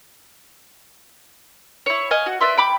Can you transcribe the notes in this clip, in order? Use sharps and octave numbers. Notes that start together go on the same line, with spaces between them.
E4 C#5
D#5 F5 G#5
F#4
B4 D5 E5 C6
G5 B5 D6